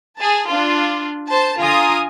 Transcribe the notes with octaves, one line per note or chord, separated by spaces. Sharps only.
G#4 A5
D4 F4
C5 A5
D3 F4 G#5 A#5 D#6